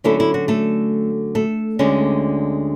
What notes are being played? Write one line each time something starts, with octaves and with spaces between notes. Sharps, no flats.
D3 F#3 A3 C#4 E4 A4
E4
F#4
A3 A4
A3 A4
D2 D3 G#3 C#4